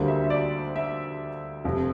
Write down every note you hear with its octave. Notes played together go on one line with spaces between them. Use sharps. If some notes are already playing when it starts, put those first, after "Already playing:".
Already playing: D2 D3 G3 A#3 C5
E5
E5
D5
E5
F1 F2 C3